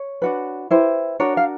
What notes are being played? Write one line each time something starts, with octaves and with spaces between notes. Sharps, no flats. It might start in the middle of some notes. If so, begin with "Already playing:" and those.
Already playing: C#5
D4 F#4 B4
E4 G4 B4 C5
D4 F#4 A#4 C#5
F5